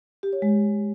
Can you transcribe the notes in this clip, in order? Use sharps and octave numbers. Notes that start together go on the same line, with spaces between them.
G4
C#5
G#3